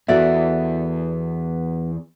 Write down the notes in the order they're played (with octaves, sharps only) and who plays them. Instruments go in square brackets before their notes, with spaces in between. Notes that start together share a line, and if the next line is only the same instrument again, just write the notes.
[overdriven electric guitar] B1 E2 [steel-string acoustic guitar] B3 F#4 F#5 [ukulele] A4 D5 E5